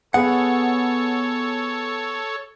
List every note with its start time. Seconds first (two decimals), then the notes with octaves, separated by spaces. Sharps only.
0.14 B3 G#4 A4 C#5 F#5